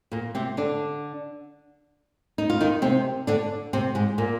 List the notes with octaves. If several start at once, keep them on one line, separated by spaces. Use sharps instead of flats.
A#2 A#3
C3 C4
D3 D4
D#4
F4
D#3 D#4
C3 C4
D3 D4
C3 C4
G#2 G#3
A#2 A#3